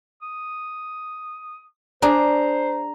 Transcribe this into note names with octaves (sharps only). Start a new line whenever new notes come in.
D#6
D4 G#4 C5 A#5